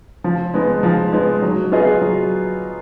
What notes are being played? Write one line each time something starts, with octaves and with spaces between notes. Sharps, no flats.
F3
G#3 B3 D#4
F3
G#3 B3 D#4
F#3
B3 F4 G#4 D#5
F#3